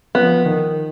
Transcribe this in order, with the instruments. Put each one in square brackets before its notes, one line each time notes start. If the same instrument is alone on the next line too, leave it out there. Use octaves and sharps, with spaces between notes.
[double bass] F3 [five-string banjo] B3
[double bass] D#3